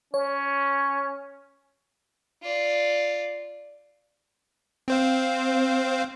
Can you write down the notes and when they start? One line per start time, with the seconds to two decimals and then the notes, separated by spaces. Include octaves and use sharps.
0.14 C#4 C#5
2.42 F4 D5
4.88 C4 C5 F5